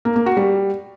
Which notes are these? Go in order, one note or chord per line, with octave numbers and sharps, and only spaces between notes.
A#3
A#3
F#4
G3